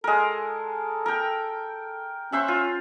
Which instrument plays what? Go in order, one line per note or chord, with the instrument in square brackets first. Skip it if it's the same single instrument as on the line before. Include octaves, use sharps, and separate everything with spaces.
[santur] G#3 A#4 [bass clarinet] A4
[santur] A#4 G5
[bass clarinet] C#4 [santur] C5 E5 F#5
[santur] F4